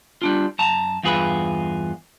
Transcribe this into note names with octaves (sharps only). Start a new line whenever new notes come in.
G3 D4 F4
F#2 A5 A#5
E2 G2 F4 G#4 B4 B5